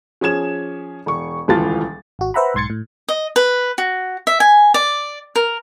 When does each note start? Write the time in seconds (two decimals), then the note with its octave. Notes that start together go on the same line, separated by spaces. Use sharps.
0.21 F3 C#4 G#4 G#6 E7
1.06 E1 C#6
1.48 D#1 C#2 E3 F4 A5 A6
2.19 G#1 F#4
2.34 B4 C5 E5 F#5 A#5 B5
2.54 B1 G#2 C6 G#6 A6 C#7
2.70 A2
3.09 D#5
3.36 B4
3.78 F#4
4.27 E5
4.40 G#5
4.74 D5
5.36 A#4